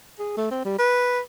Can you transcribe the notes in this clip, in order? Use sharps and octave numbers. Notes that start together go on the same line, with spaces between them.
G#4
A3
C4
G3
B4